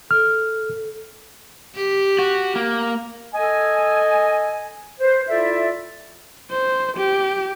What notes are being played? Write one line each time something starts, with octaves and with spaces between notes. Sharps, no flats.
A4 F6
G4
F#4
A#3
A4 D#5 G#5
B4 C5
E4 F4 A4 D5 E5
C5
G4